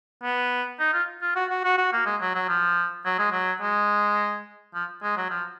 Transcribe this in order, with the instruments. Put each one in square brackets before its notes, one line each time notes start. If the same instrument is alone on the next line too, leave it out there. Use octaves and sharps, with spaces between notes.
[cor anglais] B3
D#4
F4
F4
F#4
F#4
F#4
F#4
A#3
G#3
F#3
F#3
F3
F#3
G#3
F#3
G#3
F3
G#3
F#3
F3